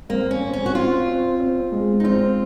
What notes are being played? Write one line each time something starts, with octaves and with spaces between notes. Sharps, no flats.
A#3 C4
C#4
C4
C#4
F#4
C4 F4
C4
C4
G#3
D#4
C4 F4